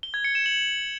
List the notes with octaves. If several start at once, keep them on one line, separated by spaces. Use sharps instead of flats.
G7
G#6
C#7
E7
F#7